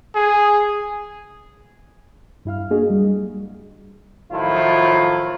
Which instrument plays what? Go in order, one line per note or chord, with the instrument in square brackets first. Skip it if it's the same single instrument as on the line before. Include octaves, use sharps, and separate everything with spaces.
[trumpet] G#4
[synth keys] G2 E4 F5 F6
A#3 D4 F#4 G#4 D#5
G3
[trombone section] A2 D#3 F3 F#3 E4 F4